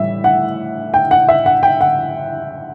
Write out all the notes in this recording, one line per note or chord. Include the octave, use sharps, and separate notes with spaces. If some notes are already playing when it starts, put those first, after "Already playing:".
Already playing: A2 E3 G3 E5
F#5
G5
F#5
E5
F#5
G5
F#5